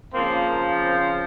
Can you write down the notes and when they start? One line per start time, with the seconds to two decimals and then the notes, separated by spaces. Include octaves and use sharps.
0.14 C#3 F3 A#3 C4
0.50 A#3
0.84 C4